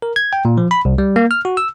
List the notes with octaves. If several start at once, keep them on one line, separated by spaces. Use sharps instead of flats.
A#4
G#6
G5
A#2
F3
B5
C2
G3
A#3
F6
F#4
E6